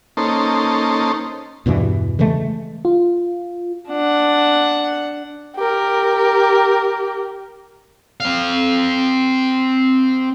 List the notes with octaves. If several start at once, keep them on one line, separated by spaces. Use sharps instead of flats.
A#3 C#4 D#4 A4 C5
E2 G2 B2 E3
C#3 E3 G#3 A3
F4
D4 F#5
G4 A#4
C4 F5